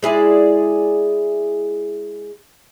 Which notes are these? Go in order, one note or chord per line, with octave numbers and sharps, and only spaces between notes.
G#3 E4 G#4 D5